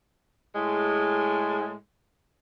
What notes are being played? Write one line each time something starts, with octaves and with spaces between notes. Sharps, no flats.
A2 G#3